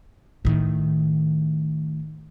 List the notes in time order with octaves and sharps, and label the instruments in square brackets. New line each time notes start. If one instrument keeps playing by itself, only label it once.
[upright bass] A2 D#3